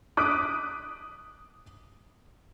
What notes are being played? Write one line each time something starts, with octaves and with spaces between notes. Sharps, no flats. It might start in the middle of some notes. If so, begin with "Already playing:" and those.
D6 D#6 F#6 B6 D7